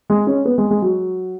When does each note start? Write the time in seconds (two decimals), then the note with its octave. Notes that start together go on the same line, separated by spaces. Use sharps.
0.10 G#3
0.27 C#4
0.45 B3
0.58 G#3
0.70 G#3
0.82 F#3